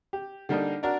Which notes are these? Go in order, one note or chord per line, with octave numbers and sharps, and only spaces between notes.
G4
D3 G3 A#3 D4 D#4
D4 F#4 A#4 D5